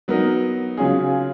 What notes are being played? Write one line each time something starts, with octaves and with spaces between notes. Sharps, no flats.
F#3 B3 D#4 A#4
C#3 F#3 C#4 F4 G#4